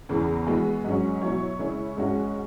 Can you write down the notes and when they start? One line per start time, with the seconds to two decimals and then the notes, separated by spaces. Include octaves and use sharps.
0.09 E2 C#3 E3
0.47 E3 G#3 B3 F#4
0.84 G#2 F#3 C#4
1.22 B2 F#3 E4 C#5
1.59 C#3 G#3 E4 C#5
1.97 G#2 G#3 C#4 F#4